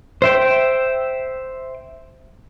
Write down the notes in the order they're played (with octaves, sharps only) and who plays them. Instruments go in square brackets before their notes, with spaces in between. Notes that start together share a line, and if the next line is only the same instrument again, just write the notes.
[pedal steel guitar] C5 E5 G5